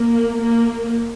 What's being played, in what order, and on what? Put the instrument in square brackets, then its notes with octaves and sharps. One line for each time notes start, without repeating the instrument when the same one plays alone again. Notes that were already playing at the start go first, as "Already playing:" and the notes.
Already playing: [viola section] A#3
A#3